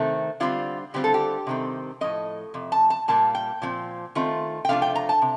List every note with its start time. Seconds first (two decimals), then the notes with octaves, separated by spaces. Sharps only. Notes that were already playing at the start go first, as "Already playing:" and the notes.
Already playing: C3 D#3 A3 C4
0.40 D3 G3 C4 F4
0.94 D3 G3 C4 F4 G4
1.04 A4
1.14 G4
1.47 C3 D#3 G3 C4
2.01 A2 F3 C4 D#5
2.54 F2 C3
2.72 A5
2.90 A5
3.08 A#2 G3 A#3 A5
3.35 G5
3.62 A#2 F3 C4
4.15 D#3 A3 C4 F4
4.65 G5
4.69 C3 F3 A3 D4 F4 F5
4.82 G5
4.95 A#5
5.09 A5
5.22 C3